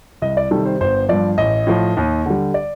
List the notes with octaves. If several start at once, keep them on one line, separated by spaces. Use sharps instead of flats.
C2 D#5
D5
C3 D#3 G3 A4
C5
G1 C5
G2 F3 D5
A1 D#5
A2 F3
D#2
D3 G3
D5